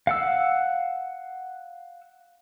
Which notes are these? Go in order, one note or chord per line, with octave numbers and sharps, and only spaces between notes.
F5 F#5 E6